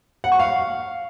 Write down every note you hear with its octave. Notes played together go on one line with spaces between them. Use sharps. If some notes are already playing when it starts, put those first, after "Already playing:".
F#5
C#6
F5